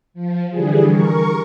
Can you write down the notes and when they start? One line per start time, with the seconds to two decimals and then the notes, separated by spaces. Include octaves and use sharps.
0.14 F3
0.50 D3 E3 G3 G#4
0.86 A#4 C#6